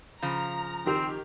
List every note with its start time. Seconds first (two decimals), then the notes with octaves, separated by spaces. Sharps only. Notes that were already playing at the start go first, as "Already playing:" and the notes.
0.22 C#3 F3 A#5
0.86 D#3 C4 G4 F7